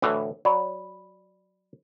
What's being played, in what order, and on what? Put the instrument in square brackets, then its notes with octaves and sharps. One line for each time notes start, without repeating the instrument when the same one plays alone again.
[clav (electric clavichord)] D2 A2 E3
[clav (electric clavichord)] F#3 [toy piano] D5 B5